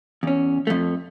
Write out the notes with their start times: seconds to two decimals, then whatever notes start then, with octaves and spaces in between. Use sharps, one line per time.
0.23 E2 C#4
0.67 F2 A3